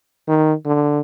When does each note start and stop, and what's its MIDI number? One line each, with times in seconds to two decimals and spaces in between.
0.28 0.53 51
0.66 1.01 50